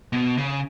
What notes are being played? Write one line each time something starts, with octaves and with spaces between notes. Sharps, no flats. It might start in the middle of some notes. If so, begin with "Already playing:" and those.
B2
C#3